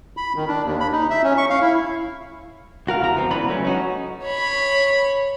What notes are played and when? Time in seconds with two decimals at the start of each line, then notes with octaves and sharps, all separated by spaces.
0.17 B5
0.36 D#3
0.48 D4
0.64 D#2
0.80 B5
0.92 D#4
1.10 E5
1.24 C#4
1.37 C#6
1.50 F5
1.61 E4
2.87 C#2 F#4 A#4 F5
3.01 E2 E4 A#4 A#5
3.15 E2 B3 C4
3.30 C#2 E3 B3 D4 B4 B5
3.48 F#3 A3 C#4
3.65 C#4 D#4 F#4
4.23 C#5 B5